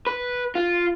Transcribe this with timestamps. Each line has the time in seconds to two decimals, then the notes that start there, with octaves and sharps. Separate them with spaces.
0.07 B4
0.55 F4